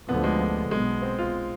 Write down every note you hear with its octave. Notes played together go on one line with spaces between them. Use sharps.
D2 D3 F3 B3
G#3
B1 B2 G#3 B3
C4
F4